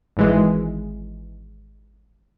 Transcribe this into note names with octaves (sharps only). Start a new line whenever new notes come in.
G#1 E3 G#3